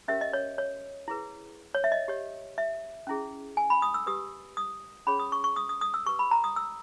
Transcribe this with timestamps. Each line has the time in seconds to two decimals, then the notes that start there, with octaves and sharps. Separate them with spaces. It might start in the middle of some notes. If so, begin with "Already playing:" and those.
0.08 C#4 G4 A#4 C#5 E5
0.21 D#5
0.33 C#5
0.58 C#5
1.08 E4 G#4 B4
1.75 C#5
1.84 E5
1.92 D#5
2.08 G4 C#5
2.58 E5
3.07 C#4 E4 G#4
3.57 G#5
3.70 B5
3.82 D#6
3.94 E6
4.07 G4 B4 D#6
4.57 D#6
5.07 C#4 G#4 C#5 B5
5.19 D#6
5.32 C#6
5.44 C#6
5.56 D#6
5.69 D#6
5.81 D#6
5.94 E6
6.06 G4 B4 C#6
6.19 B5
6.31 A#5
6.44 D#6
6.56 E6